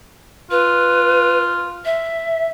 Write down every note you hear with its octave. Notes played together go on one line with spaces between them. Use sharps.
F4 B4
E5